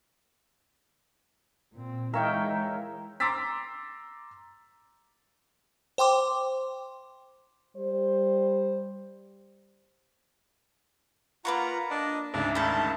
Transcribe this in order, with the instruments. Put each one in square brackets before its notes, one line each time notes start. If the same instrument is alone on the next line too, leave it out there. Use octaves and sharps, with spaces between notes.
[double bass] A#2 C4
[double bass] E3 G#3 [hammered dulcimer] D#4 C#5 E5 [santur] A#4 F5 [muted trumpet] G5
[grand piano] A#5 C6 D6 E6 A6 B6
[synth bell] C5 G5 C6 D6
[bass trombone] G3 [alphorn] C5
[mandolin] A#3 B4 C#6 [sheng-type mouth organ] F4 F#5 A#5
[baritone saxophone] D4 [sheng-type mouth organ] D#5
[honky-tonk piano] D2 G#2 C#3 [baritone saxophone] D4 [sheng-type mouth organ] A4
[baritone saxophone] D#3 [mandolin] E4 A4 [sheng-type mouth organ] A5